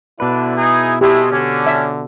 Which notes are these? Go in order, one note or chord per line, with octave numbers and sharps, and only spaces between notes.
B2 D3 D4 E4 B4
D#4 G#4
G#3 A3 E4 G4
D3 C#4 D4
E5